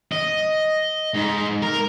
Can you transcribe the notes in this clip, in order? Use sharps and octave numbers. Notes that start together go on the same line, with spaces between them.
D#5
G#2
A#4